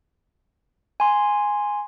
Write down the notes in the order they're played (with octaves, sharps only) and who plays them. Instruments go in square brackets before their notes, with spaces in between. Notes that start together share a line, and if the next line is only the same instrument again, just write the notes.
[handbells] G#5 C6